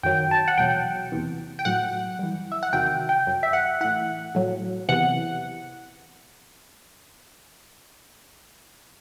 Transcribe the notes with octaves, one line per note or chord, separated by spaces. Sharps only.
F#2 D#3 F#3 G5
A5
F#5
E2 B2 F#3 G5
E2 C3 E3
G5
A2 F#3 F#5
G2 E3
E5
F#5
E2 C3 D#3 F#3 G5
G5
F#2 F#3
E5
F#5
A2 E3 F#5
A2 F#3
E2 C3 E3 F#5